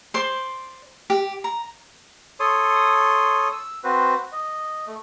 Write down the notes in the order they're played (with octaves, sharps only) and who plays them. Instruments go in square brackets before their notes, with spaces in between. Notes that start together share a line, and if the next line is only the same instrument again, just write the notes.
[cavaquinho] C5 D5 C6
G4
A#5
[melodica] A4 C#5 C6 D#6
E6
C4 F#4 B4 C5
D#5
A3